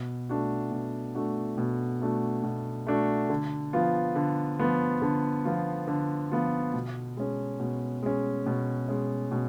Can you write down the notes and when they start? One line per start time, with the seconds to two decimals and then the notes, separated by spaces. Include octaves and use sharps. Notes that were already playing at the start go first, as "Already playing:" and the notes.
Already playing: B2
0.29 A3 D4 F#4
0.72 B2
1.15 A3 D4 F#4
1.58 B2
2.01 A3 D4 F#4
2.44 B2
2.87 A3 D4 F#4
3.30 D3
3.73 F3 B3 F4
4.16 D3
4.59 F3 B3 F4
5.02 D3
5.45 F3 B3 F4
5.87 D3
6.32 F3 B3 F4
6.74 B2
7.17 G#3 C#4
7.60 B2
8.02 G#3 C#4
8.46 B2
8.89 G#3 C#4
9.32 B2